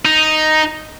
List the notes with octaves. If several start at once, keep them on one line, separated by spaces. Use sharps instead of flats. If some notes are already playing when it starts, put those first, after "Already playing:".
D#4